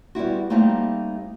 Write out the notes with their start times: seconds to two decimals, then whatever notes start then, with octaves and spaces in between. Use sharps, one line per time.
0.15 G3 B3 E4 F#4
0.50 G3 A3 A#3 C4 D#4 E4